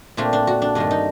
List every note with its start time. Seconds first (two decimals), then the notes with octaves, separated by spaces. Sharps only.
0.17 A#2 A3 C4 D4
0.33 D4
0.47 F#4
0.62 D4
0.75 G2 D#3 A3 D4
0.91 D#4